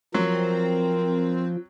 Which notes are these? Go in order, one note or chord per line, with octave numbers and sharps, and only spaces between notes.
F3 F#3 C4 A#4